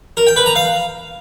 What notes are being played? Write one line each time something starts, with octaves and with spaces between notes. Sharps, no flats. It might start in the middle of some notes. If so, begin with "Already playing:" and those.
A#4
G5
B4
A#5
F5